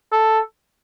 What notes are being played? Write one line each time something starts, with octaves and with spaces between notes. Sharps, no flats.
A4